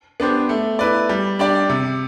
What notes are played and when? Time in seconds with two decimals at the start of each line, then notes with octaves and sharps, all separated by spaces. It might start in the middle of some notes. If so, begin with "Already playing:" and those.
0.20 B3 D4 G4 C5
0.49 A3
0.79 E4 B4 D5
1.09 G3
1.39 D4 G4 D5
1.69 C3